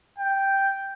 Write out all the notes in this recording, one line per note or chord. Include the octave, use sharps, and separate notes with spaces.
G5